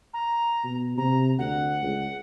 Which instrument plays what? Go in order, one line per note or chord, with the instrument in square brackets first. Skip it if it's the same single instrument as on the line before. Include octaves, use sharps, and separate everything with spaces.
[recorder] A#5
[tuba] B2
[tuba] C3 [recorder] A#5
[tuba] D2 [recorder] F#5
[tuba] C#2